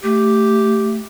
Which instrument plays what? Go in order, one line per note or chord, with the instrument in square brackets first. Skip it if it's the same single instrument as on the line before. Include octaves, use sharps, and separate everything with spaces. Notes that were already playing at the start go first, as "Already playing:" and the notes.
[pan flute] A3 [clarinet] G4